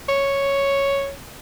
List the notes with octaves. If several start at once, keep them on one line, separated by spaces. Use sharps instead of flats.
C#5